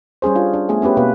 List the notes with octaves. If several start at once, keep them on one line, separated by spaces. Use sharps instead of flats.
G3 C#4 G#4 C5
D4 F4
D4
A3 B3 G#4
B3 C#4 G4 B4
B2 A#3 B4